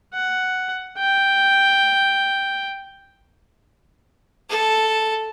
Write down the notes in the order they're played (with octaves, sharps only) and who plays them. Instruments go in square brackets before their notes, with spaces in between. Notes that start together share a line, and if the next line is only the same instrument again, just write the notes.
[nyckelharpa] F#5
G5
[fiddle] A4